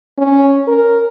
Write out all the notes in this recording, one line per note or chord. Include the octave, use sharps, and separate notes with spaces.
C#4
A#4